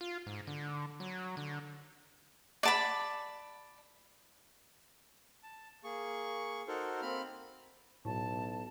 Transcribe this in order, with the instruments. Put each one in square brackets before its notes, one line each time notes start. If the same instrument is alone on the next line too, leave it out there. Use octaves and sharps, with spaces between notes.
[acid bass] F4
G#2
D3
F#3
D3
[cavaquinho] D5 A5 B5
[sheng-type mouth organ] A5
A#3 G#4 C#6
D#4 F#4 A4 A#4 C5
A#3 C4 B5 F6
[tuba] B1 [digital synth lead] A2 [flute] A5